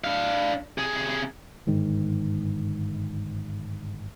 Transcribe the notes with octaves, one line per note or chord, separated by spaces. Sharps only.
D4 F5
C3 G#4
G1 G#2 D#3